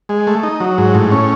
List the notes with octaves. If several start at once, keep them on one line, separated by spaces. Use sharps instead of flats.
G#3
A3
D#4
F#3
G#2
A2
C#4